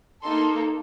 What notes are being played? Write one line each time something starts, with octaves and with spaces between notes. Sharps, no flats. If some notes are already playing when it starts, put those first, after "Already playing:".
A#3 D#4 A4 C6